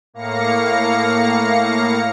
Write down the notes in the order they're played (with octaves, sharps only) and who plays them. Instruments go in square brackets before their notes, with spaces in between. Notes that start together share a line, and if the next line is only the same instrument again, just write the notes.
[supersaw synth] A2 A#3 F5 A#6 C#7